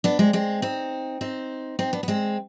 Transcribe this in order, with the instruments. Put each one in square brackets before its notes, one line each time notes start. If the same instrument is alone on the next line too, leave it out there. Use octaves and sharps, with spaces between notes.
[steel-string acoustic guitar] B3 D4
G#3 C4
G#3 C4
C4 D#4
C4 D#4
C4 D#4
B3 D4
B3
G#3 C4